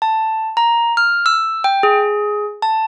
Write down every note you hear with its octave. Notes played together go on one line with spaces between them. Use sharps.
A5
A#5
F6
E6
G5
G#4
A5